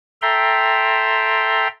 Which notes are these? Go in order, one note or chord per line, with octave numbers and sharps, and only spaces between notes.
A4 E5 G5 A#5 C6